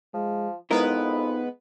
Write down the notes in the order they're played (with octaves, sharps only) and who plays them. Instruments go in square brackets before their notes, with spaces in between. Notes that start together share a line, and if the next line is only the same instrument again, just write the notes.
[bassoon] F3 [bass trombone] G#3
[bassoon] F2 [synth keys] G#3 B3 B4 [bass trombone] D#4 [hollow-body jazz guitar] E4 A#4